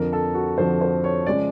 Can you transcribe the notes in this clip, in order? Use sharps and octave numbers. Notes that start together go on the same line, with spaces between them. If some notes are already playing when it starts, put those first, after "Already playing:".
Already playing: F2 D3 F3 A#4
A4
F#4
F2 D3 F3 C5
C5
C#5
C#3 F3 G#3 D5